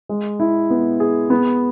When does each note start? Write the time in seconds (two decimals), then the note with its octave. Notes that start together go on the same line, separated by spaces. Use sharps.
0.09 G#3
0.40 E4
0.70 B3
1.00 G#4
1.30 B3